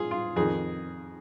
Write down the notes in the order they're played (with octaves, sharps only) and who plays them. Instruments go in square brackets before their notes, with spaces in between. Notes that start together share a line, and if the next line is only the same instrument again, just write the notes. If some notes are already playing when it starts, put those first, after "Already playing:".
Already playing: [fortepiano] F4 G#4
F4
F2 D#3 G#4